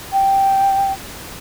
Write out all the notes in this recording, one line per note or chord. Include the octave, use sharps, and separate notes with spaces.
G5